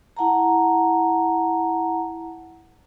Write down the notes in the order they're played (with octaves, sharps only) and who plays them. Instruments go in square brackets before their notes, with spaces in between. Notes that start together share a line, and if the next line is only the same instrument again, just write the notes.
[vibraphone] E4 F#5 A5 A#5